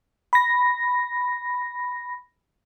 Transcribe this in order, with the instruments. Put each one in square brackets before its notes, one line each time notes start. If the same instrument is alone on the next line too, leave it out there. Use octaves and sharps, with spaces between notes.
[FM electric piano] B5 A#6